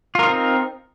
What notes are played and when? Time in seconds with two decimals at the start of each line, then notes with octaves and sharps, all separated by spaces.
0.15 F4
0.19 A#4
0.23 D#4
0.27 C4